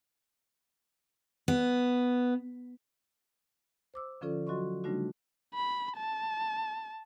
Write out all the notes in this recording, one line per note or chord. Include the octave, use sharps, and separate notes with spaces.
B3
C5 D6 E6
D3 F3 C#4 F4 A4 D5
F#3 F#4 D#5 C6 C#6
C#3 G3 A3 D4 D#4 F#4
B5
A5